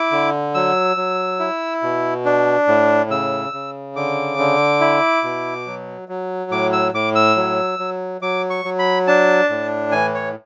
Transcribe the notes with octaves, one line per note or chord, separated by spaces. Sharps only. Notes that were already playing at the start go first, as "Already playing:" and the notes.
Already playing: E4 D6
D3
F#3 E6
F#3
E4
B2
D4
A2
C#3 E6
C#3
D3 D6
D3
E4
B2
F#3
F#3
A2 D6
E6
A2 D6
E6
F#3
F#3
F#3 D6
C#6
F#3
B5
D4 A5
A2
E3 G#5
C#5